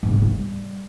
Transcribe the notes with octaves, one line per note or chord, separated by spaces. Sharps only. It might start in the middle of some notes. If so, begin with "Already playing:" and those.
G2
C#3
G#2
G3